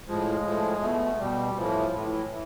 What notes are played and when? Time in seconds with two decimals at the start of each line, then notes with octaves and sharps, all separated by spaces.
0.07 A2 F3 G#3
0.45 A2 F3
0.81 B2 A3
1.19 B2 G3
1.56 A2 E3 F3
1.92 A2 E3
2.30 E3